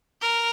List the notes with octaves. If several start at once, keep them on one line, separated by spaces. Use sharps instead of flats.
A#4